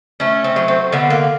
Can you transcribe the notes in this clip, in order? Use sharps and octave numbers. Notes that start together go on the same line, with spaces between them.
A3 C#4
C4
F#3
C4
D3 B3
A#3